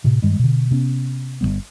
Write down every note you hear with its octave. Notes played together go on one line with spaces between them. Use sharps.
A2 C3
G2 D#3 G3 G#3
B2 D3
C3 B3 C#4
G1 E2 G3 B3